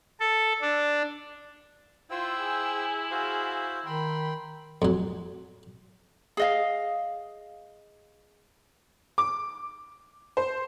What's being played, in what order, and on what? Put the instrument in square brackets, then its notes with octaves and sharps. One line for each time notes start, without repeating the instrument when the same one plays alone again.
[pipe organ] A4
D4
[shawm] E4 [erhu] F4 [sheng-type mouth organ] C5 G5 E6
[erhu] G#4
[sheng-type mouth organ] F#4 C5 F5 [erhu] G#4
[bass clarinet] D#3 [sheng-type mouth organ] G5 C6 [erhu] B5
[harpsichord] F2 F#3
[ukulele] G#4 D#5 F5
[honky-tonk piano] D6
C5